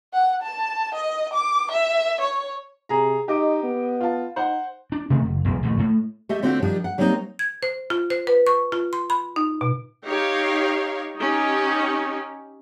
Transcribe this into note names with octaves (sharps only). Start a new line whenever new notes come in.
F#5
A5
D#5
D6
E5
C#5
C3 G#4 A#5
D#4 G4 D#5 D6
B3
F4 A5
D#4 C5 F#5 C6
D4
C3 D#3 A3 C4
F#1
E1 B1 E2
A#1 D#2 A3
A2
A3 G4 D#5 E5
D3 A3 C4 F4 F#4
D#3 F3 G3 D4
F#5
F#3 G3 A#3 C4 D#4 C5
G#6
C5
F4
C5
B4
C#6
F4
C6
B5
D#4
B2
D#4 G4 C#5 F5
C#4 D#4 G4